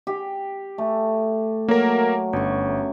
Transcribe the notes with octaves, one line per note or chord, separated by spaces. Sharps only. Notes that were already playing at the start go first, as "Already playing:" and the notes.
G4
A3
F#3 A#3 A#4
G1 F#2 C#6